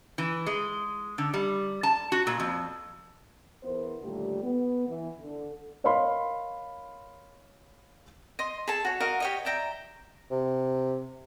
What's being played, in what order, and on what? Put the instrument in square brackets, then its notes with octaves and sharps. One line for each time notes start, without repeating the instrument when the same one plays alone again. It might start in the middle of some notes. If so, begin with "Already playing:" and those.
[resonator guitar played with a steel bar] E3
G#3
D3
G3
A5
F#4
A#2
F2
[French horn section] E2 B3 E4 A#4 C5
D#2 A#2 D3 G3 A3 G4
B3
E3
D3
[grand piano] A#4 C#5 D#5 F5 B5 C6
[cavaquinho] D#5 C6
G#4 A4 A5
F#4 C#5
F#4 A#4 D#5 F5
G4 C#5 D#5
D5 E5 G5 A#5
[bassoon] C3